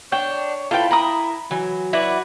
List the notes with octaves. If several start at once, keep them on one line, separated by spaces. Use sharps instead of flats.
D4 C#5 G5
E4 F4 A4 B4 G5
A#4 G5 B5 D#6
E3 F#3
E4 F#4 B4 D5